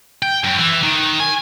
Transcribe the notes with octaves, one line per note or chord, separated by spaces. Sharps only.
G5
F#2
E3
D#3
G#5